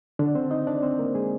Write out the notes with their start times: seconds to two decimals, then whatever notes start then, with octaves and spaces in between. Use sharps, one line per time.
0.19 D3 D4
0.35 C4 C5
0.51 D#4 D#5
0.67 D4 D5
0.83 C4 C5
0.99 A#3 A#4
1.15 G#3 G#4